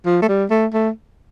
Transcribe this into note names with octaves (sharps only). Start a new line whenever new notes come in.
F3
A3
G3
A3
A3